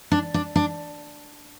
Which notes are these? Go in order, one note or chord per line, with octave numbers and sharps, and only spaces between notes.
D4
D4
D4